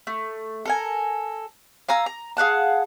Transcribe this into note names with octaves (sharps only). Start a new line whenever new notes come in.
A3
A4 A#4 G#5
F5 G#5 A#5 E6
A#5
G#4 F5 F#5 A5